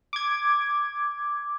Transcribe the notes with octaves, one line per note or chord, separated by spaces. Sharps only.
D6 G#6